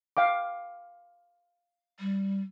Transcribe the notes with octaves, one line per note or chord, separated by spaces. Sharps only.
F5 G5 D6
G3